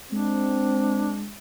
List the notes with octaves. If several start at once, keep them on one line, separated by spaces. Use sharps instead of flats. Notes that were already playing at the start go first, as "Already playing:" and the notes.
G#3 C4 D4